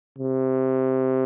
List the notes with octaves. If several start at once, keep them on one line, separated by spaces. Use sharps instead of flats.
C3